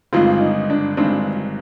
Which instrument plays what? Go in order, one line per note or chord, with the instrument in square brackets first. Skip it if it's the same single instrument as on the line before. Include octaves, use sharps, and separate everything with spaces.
[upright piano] G1 G2 D#3 G#3 C4 [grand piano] F4
[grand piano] D#4
D4
[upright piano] G1 G2 D#3 G#3 C4 [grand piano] D4